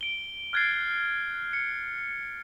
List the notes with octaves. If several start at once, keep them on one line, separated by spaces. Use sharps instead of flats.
D7 G7
F6 F#6 G#6 A6 C7 D7
C#7